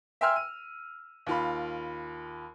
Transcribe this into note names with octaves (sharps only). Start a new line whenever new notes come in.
E5 G5 G#5 C6 E6 F6
D#7
D#2 F4 B5